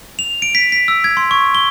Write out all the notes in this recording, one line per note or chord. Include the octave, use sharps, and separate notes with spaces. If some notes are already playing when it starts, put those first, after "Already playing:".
F7
D7
B6
B6
E6
G#6
C6
C#6
G7